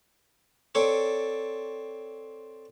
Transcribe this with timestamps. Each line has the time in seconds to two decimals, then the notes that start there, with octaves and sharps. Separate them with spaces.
0.75 C4 A4 C#5 D5